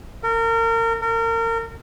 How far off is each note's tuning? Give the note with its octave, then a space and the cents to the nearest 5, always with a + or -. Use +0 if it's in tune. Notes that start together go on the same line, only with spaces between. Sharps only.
A#4 -30
A#4 -30